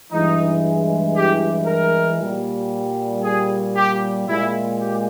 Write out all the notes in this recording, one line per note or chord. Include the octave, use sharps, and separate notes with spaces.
G2 E3 G#3 D#4
G4
A#4
A#2 G3
G#4
G4
A#2 G#3 E4
G4